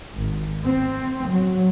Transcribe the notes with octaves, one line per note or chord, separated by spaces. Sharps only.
G#1
C4
F#3